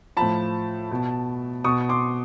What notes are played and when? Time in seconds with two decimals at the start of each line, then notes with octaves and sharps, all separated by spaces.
0.17 A2 F3 A5 B5
0.91 B2
1.64 B2 C#6 D#6
1.89 C6 D6